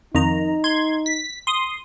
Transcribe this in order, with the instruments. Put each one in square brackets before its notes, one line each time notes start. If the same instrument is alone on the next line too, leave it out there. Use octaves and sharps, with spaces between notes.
[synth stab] F2 D#3 A#5 [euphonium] D#4
[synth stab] C6 G#6
B6
C6 D#6